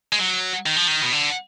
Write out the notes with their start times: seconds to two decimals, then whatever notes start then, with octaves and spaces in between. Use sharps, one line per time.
0.12 G#3
0.19 F#3
0.66 D#3
0.76 F3
0.87 D#3
1.02 B2
1.12 D3